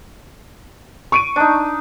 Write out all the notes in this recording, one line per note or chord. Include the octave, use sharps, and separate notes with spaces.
C#6 D7 D#7
D4 D#4